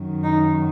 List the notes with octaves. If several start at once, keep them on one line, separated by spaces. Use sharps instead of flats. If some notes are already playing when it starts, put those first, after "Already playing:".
Already playing: F#2 D#3
D#4